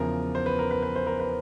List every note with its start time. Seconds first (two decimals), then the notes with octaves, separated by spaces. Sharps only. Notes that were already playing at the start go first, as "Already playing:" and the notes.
Already playing: E2 C#3 F3 A#4
0.35 C5
0.46 B4
0.59 A#4
0.71 B4
0.83 B4
0.96 C5
1.07 A#4
1.20 B4